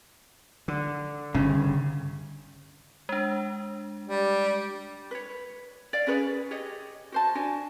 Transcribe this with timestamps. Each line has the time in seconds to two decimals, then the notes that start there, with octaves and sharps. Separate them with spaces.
0.68 D3
1.35 G1 G2 C#3
3.09 G#3 D4
4.07 G3
5.11 B4 C#5
5.93 D5 F5
6.07 C#4 G#4 B4 C#5
6.51 G4 G#4 C#5 D#5
7.12 F#4 C5 A5
7.35 D4 F#4 G#5